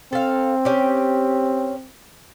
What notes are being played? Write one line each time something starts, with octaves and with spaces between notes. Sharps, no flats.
C4 A4 F5
C#4 G4